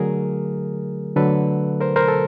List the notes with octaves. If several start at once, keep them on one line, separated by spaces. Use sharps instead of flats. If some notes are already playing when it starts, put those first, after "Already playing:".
Already playing: D3 F#3 A3 G#4 A#4
D3 F#3 A3 A4 B4
A#4 C5
A#4 C5
A4